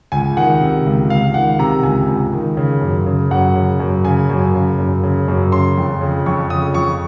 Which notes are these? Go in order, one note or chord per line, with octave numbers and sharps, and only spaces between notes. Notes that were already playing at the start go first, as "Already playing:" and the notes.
C#2 G#5
D#3 F#5
C3
C#2
C#2 F5
D#3 F#5
C3 A#5
C#2 G#5
C#2
D#3
C#3
F#2
C#3
F#2 F#5
C#3
F#2
C#3 G#5
F#2
C#3
F#2
C#3
F#2
C#3 C6
F2
C#3
F2 C#6
C#3 D#6
F2 C#6